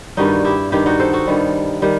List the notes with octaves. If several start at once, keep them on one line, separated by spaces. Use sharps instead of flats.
G2 D#3 G3 D#4 F#4
E4 G4
G2 D#3 G3 E4 G4
D#4 F#4
A4 C5
F#4 A4
G2 D#3 G3
D#3 G3